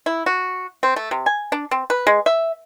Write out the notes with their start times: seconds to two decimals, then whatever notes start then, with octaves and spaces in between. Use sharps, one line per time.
0.06 E4
0.26 F#4
0.83 C4
0.96 A3
1.11 C3
1.26 G#5
1.52 D4
1.71 C4
1.90 B4
2.07 G#3
2.26 E5